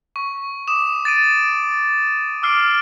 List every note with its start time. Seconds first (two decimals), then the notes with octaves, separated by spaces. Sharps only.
0.16 C#6
0.67 D6 D#6 E7
1.05 A6 D7 D#7
2.42 D6 E6 F6 C7 D7